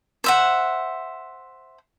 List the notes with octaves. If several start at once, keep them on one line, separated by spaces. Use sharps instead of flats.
C5 E5 F#5